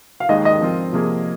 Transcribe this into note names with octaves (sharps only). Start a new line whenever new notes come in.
F5
D#2 D#3 G#3 D#4 D#5
D#5
F3 C4 F4 A#4
C3 F3 A#3 G#4